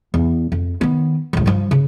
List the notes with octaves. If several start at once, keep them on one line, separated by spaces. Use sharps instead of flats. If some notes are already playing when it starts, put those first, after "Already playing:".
E2
F2
D#3 B3
A1 D2
G2 F3
C#3